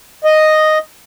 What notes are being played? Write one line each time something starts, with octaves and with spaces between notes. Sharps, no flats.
D#5